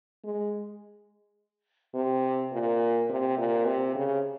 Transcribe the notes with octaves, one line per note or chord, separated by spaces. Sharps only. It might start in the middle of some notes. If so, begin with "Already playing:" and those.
G#3
C3
A#2
C3
A#2
C3
C#3